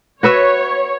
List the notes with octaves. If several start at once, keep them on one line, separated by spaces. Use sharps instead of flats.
F#4 B4 C#5 E5